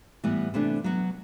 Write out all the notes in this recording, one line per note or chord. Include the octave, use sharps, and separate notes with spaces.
A2 E3 G3 B3
C3 E3 A3 D4
F#3 B3 F#4